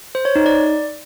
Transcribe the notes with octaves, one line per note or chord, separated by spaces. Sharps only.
C5
C#5
D#4
D5